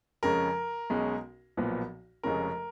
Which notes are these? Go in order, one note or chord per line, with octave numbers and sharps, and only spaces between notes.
F2 C#3 G#3 C#4 A#4
B1 B2 G#3 C#4
B1 A#2 F3 B3
F1 F2 C#3 G#3 C#4 A#4